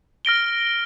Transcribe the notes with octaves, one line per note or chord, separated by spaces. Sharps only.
F6 A#6 D7 G7